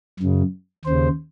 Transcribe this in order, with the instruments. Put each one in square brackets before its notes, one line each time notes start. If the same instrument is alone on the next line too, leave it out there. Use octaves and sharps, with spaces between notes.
[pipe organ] F#2 C#3
D#2 C#3 C5